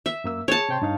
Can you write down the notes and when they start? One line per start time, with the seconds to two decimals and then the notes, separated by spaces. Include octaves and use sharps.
0.06 E5
0.24 F#2 A#3 E6
0.48 G#4 C#5 A5
0.69 C3 G5 C6
0.82 G2 D#4 F5